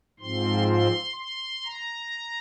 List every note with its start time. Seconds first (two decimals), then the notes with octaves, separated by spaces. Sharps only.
0.20 G#2 F3 C4 C6
0.68 C6
1.17 C6
1.65 A#5